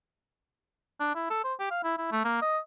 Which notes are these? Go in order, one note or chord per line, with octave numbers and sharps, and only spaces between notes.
D4
E4
A4
C5
G4
F5
E4
E4
A3
A#3
D#5